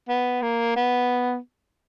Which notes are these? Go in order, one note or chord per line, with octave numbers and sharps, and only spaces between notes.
B3
A#3
B3